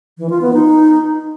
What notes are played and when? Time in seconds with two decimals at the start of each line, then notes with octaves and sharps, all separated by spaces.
0.18 E3
0.30 F4
0.41 B3
0.53 D#4